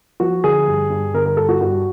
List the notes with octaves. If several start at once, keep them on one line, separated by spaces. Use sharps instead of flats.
F3 F#4
D3 G#4
G2
G2
D3 A#4
A#4
G2 A4
F#4
G2 F#4